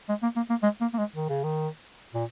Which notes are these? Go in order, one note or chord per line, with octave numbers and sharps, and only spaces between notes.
G#3
A#3
A#3
A#3
G#3
A#3
A#3
G#3
D#3
C#3
D#3
A#2